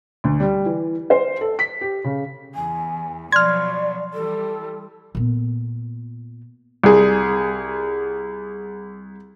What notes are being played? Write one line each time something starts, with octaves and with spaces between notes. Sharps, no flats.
D2
G3
E3
C5
A4
B6
G4
C#3
E2 G#5
B2 F3 F#3 D5 C6 F6 G#6
E3 G3 A4
A#2 B3
C2 G#4